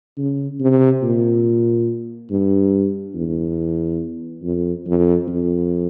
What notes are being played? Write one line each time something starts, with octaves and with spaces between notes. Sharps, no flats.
C#3
C3
A#2
G2
E2
F2
F2
F2